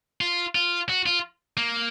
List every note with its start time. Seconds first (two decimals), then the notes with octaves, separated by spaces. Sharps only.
0.21 F4
0.55 F4
0.89 F#4
1.06 F4
1.57 A#3